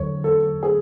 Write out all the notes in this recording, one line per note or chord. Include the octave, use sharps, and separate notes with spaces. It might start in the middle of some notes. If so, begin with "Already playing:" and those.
Already playing: E2 D3 F#3 C#5
A4
G#4